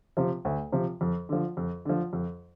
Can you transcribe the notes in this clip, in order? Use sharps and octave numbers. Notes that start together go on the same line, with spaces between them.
C3 F3
D2
C3 F3
F2
D3 F3
F2
D3 F3
F2